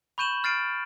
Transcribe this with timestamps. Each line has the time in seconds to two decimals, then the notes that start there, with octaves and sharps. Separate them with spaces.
0.18 B5 C#6 G6 D#7 E7 F#7
0.43 C#6 F6 A6 C7 D7 D#7